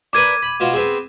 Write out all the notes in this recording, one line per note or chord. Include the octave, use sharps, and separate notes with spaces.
D4 A#4 B4 D6 G#6 D#7
B5
B2 F4 F#4
B3 C4 G#4